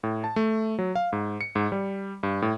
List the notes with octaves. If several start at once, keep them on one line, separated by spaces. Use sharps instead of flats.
A2
A5
A3
F#3
F5
G#2
C#7
G#2
G3
G2
A2